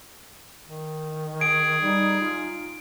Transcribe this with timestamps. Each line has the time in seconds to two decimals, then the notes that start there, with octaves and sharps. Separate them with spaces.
0.66 D#3
1.41 G#4 D7
1.82 G3 D#4
2.20 F4